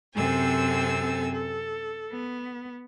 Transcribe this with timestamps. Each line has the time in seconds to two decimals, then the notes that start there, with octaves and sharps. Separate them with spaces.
0.15 F#2 C3 C4 A4 G#5 E6
1.30 A4
2.09 B3